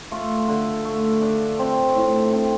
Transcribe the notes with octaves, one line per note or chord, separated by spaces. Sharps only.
A3 F4
D3
A3
D4
C4
A2
C4